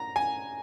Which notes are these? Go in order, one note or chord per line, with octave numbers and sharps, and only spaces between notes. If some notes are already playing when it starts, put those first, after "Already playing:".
Already playing: A#5
G#5